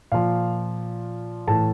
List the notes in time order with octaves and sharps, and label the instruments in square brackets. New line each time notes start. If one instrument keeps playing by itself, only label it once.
[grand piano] A#2 F3 F5
A2 E3 A5